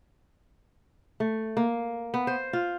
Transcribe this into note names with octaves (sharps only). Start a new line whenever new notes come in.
A3
A#3
B3
C5
F4